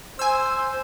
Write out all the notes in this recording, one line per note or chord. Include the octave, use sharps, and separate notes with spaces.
C5 G#5 E6